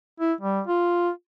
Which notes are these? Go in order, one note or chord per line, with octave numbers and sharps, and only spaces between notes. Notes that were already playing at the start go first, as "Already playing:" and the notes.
E4
G3
F4